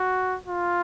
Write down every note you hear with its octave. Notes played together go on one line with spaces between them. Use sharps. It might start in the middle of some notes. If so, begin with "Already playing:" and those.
Already playing: F#4
F4